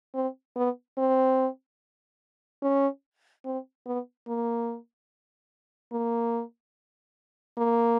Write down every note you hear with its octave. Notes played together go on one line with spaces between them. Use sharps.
C4
B3
C4
C#4
C4
B3
A#3
A#3
A#3